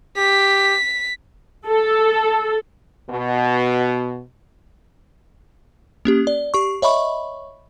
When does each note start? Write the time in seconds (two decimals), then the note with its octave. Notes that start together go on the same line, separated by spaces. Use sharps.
0.17 G4 B6
1.67 A4
3.10 B2
6.05 A#3 C#4 G4
6.27 D5
6.54 G4 C#6
6.82 C#5 D#5 E5 B5 C#6